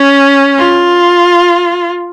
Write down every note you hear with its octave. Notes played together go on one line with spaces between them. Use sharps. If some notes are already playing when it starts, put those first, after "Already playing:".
Already playing: C#4
F4